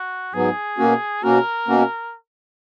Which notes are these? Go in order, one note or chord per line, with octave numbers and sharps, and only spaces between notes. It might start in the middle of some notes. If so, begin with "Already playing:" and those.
Already playing: F#4
G#2 F#3 B3 G#4
B2 A#3 C#4 F#4
B2 A#3 C#4 F#4 A#4
B2 A#3 C#4 F#4